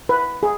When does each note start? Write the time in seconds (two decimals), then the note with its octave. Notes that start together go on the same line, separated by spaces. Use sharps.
0.09 B4
0.43 G#4